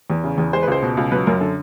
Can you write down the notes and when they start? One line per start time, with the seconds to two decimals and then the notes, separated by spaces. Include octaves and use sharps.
0.10 E2
0.24 C#3
0.38 E2
0.53 G#3 C5
0.63 B4
0.67 C#2 C5
0.82 B2
0.97 C#2
1.12 F#3 B4
1.27 F#2 A#4
1.41 D3 A4